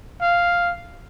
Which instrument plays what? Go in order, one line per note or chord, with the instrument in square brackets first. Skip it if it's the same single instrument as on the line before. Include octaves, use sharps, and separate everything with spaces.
[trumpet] F5